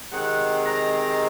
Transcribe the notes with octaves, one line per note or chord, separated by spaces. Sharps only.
C3 D#3 G#3 C4 F#5
A#5